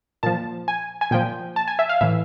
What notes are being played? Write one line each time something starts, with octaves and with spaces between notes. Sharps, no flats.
A#2 F3 A5
G#5
G#5
A#2 F3 G5
A5
G#5
E5
F5
A2 E3 E5